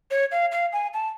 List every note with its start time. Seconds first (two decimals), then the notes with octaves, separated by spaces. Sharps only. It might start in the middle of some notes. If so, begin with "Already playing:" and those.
0.11 C#5
0.32 F5
0.52 F5
0.73 G#5
0.94 A5